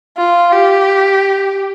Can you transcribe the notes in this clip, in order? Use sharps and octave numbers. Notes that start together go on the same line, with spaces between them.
F4
G4